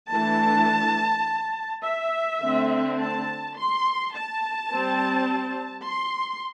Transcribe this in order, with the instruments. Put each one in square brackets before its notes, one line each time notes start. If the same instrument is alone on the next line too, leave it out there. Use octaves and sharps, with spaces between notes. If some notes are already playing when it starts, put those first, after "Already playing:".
[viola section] E3 A3 D4 A5
E5
D3 A3 C4
A5
C6
A5
G3 C4
C6